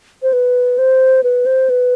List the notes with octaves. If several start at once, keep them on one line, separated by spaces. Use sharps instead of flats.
C5
B4
C5
B4
C5
B4